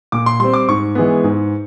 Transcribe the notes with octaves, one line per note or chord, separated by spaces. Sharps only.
A#2 D6
C6
G3 C4 C6
D6
G#2 C#6
E3 G#3 B3
G#2